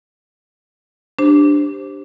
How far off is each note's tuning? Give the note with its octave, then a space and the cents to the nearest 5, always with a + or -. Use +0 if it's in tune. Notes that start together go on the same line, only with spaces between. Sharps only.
D4 +0 G4 +0 C5 +10